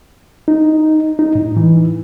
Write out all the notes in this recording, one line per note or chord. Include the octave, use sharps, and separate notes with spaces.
D#4
D#4
A2
E3